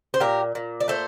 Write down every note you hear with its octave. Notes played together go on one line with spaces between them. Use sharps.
C5
A#2 G4 A#4
A#2
D5
A3 A4 C5